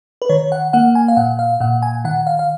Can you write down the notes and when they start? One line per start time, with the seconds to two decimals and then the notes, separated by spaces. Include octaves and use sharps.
0.22 B4
0.29 D#3 C#5
0.52 F#5
0.73 A#3 F#5
0.95 G#5
1.08 F5
1.16 A#2 F#5
1.39 F5
1.60 A#2 F#5
1.82 G#5
2.05 D#3 F#5
2.27 F5
2.39 F5